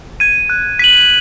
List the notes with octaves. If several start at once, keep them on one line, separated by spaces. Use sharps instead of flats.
G#6 D#7
F#6
B6 D#7 F#7